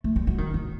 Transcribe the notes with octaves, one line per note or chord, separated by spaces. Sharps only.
A3
G3
F#3
D#3
F#3